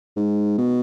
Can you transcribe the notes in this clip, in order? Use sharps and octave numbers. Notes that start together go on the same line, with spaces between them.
G#2
B2